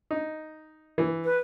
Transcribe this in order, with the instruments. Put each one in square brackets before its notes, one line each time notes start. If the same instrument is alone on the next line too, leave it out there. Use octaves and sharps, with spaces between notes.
[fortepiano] D#4
E3
[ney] B4